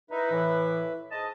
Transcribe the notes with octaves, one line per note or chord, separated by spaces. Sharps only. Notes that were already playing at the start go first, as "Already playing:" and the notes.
D#4 E4 B4 E5
A2 E3
G#2 D#5 A5